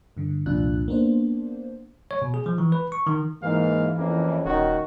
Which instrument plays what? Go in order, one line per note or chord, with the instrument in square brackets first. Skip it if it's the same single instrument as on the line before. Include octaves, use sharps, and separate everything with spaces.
[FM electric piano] G2 D3
C2 F2 A#2 D4 F4 F#6
A#3 B3 D4 C5
[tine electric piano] C#5
B2
G#4
F3
E3
B4
C#6
D#3
[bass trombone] G#2 [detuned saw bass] E3 [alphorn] A#3 [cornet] F5
[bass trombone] F2 [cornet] A#3 [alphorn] C#4
[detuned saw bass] D#1 [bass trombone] D#3 [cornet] F#4